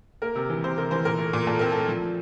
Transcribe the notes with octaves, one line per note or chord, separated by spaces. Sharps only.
A#3 A#4
C3
E3
C3 C5
C3 A#4
E3 C5
A#2 A#4
A3
A#2
A#2 A4
C4 A#4
A3 A4
F3